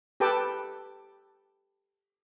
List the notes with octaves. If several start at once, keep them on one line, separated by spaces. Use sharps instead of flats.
G4 A4 B4 G5 A5 D6